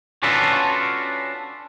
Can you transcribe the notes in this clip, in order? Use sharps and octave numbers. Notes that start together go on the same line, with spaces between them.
C#4 D4 F4 F#4 A4 B4